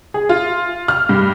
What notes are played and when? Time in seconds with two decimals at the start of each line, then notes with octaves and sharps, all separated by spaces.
0.14 G#4
0.29 F4
0.88 F6
1.09 G2